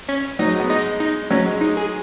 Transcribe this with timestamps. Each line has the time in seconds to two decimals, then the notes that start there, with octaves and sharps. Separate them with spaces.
0.09 C#4
0.39 F#3 D#4
0.49 G#3
0.60 B3
0.69 G#3 D#4
1.00 D#4
1.31 F#3 C#4
1.46 G#3
1.61 G#3 D#4
1.77 G#4